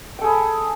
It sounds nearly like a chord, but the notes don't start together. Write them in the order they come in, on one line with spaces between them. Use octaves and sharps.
G5 A4 G#4 B5